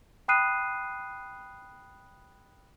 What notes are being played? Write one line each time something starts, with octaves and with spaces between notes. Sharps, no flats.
G5 B5 D#6 F#6 C7 D#7